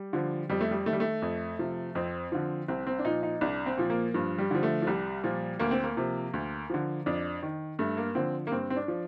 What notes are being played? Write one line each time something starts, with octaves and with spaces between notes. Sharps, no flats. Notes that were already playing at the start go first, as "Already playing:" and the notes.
Already playing: G3
D3 F3
F2 G3
A3
G3
D#3 A3
G3
A3
F2
C3 F3
F2 C4
D3 F3
C2 C4
C4
D4
A#2 F3 D#4
D#4
C2 D4
C4
A#2 F3
A#3
G2 F3
G3
D3 F3
A3
F3
C2 G3
A#2 F3
D2 A#3
C4
A#3
C3 F3
D2
D3 F3
F2 D4
D#3
G2 A3
A#3
D3 F3 C4
A#3
G2 C4
C4
D4
F3